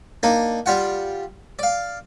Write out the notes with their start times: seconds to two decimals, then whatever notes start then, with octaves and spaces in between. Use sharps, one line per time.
0.23 A#3 D4 D#4
0.66 G3 F4 F#5
1.59 D5 F5